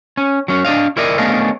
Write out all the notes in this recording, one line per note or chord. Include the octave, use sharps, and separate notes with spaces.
C#4
F#3 C#4
D4 D5 D#5 F5
E4 A#4 D5 D#5
A3 B3 C#4 D4 D#5 F5